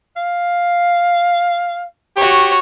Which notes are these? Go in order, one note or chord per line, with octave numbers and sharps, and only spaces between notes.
F5
F#4 G4 C#5